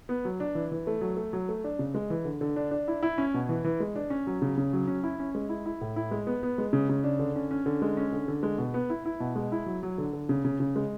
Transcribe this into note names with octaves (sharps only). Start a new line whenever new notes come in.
B3
F#3
D4
E3
E3
A3
F#3
A3
F#3
A3
D4
C#3
G#3
E3
D3
D3
D4
D4
E4
E4
C#4
B2
E3
E3
G#3
D4
C#4
F#3
C#3
C#3
F#3
C#4
E4
C#4
G#3
E4
E4
A2
E4
G#3
B3
B3
G#3
C#3
C#3
D4
D3
C#4
C#4
D3
G#3
C#4
D3
D3
G#3
B2
B3
E4
E4
B2
G#3
E4
F#3
F#3
D3
D3
C#3
C#3
C#3
G#3